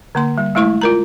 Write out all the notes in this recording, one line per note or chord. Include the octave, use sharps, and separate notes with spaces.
D3 A#3 C6
G3
G#3 A3 E4 C#6
F4 A#4 A#5